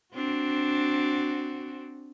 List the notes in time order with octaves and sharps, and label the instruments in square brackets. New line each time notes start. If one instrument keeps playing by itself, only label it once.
[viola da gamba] C4 D4 F#4